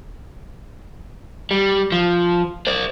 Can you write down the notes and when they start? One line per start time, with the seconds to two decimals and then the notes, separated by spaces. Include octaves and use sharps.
1.51 G3
1.92 F3
2.67 C5 D5